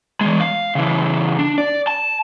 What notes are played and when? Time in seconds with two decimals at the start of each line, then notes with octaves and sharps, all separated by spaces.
0.21 E3 G#3
0.40 F5
0.75 C#3 E3
1.39 D4
1.58 D5
1.87 A5